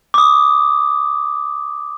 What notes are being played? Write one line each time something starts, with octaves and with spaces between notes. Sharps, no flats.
D6 D#6